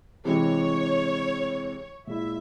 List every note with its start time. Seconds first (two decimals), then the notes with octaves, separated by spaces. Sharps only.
0.25 C3 E3 G#3 E4 G4 C#5
2.07 A#2 G#3 E4 E5